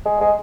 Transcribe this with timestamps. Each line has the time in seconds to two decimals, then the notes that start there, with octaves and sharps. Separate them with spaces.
0.06 G#3
0.21 G#3